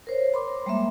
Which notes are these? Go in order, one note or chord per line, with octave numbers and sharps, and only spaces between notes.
A#4 C5 C#5
B5 C6 D6
G3 G#3 A#3 E5